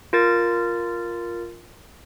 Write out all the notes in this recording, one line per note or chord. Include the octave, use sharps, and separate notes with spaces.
F4 A#4 A6